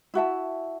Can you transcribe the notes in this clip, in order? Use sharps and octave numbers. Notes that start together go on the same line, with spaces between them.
E4 F#4 E5 A5